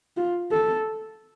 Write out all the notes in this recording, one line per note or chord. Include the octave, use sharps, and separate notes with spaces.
F4
A4